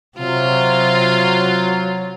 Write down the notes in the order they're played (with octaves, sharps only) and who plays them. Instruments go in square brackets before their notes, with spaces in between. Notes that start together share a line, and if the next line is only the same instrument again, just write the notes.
[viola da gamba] C3 [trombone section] F#3 [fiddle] F4